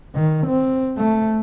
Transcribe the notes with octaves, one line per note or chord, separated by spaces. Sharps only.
D#3
C4
A3